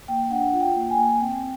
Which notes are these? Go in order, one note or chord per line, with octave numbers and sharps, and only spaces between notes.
A#3 G5
D4 F#5
F4
G5
A#3
G#5
A#3
C4 G5